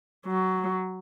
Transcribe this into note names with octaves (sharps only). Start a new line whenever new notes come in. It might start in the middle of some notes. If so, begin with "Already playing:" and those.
F#3